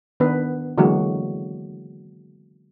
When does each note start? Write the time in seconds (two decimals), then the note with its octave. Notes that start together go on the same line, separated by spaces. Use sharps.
0.20 D#3 B3 D4 B4
0.78 D3 E3 F#3 G#3 A#3 F#4